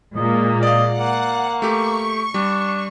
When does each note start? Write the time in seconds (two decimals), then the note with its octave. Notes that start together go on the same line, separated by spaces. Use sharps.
0.16 A#2 G#3 A#3 D#5
0.63 D5 D#5 F5
0.98 A#3 F#5
1.62 A3 G4 C#6
2.34 G3 D4